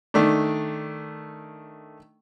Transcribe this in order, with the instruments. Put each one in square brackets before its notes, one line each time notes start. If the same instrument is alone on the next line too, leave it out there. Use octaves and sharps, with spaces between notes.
[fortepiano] D#3 A3 D4